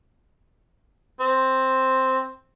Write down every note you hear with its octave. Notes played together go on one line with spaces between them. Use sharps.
C4